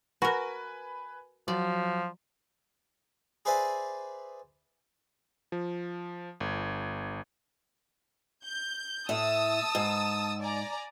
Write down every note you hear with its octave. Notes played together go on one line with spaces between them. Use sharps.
F#4 A#4 B4 G#5 B5
F3 F#3 D5
G#4 B4 C5 D5 E5 G#5
F3
G1
G6
A2 E5 A5 D#6 E6
G#2
D5 G#5 A#5